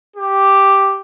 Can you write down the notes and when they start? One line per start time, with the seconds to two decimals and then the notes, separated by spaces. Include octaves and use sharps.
0.16 G4